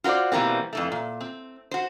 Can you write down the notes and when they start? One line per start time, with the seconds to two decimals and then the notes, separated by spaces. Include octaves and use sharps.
0.04 F4 F#4 A#4 C5 D5
0.32 B2 E3 G3 A#3 C4
0.73 F2 E3 A3
0.92 A#2
1.21 C4
1.71 F#4 C5